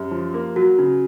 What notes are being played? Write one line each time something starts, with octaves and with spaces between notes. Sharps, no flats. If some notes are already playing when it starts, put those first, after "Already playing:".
Already playing: F#2 G4
F3
A#3
F#3 F#4
C#3